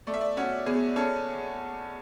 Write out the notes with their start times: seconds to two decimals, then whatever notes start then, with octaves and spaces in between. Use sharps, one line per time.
0.07 A3 D5
0.14 E5
0.21 D5
0.37 C#4 F#4
0.66 E2 G#4
0.96 C#4 A4